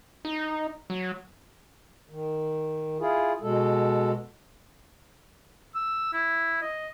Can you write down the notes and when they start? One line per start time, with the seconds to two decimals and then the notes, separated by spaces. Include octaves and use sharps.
0.25 D#4
0.90 F#3
2.10 D#3
3.00 E4 F4 G#4
3.41 B2 G#3 A4
5.75 E6
6.13 E4
6.62 D#5